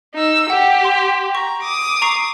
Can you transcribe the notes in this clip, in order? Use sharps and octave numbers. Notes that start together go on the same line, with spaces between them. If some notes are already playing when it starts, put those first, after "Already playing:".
D#4 E6
G4 F#5
C6
A#5 C#6
D6 D#6
A#5 C#6 C7